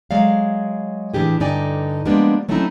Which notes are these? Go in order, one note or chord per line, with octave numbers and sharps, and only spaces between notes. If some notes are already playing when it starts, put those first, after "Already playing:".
F#3 G#3 D5 F5
A2 E3 G#3 D4 G4 G#4
G2 D3 D#4 D5 G5 G#5
F3 G3 G#3 A#3 B3 D4
F#3 A3 C4 C#4 D#4 E4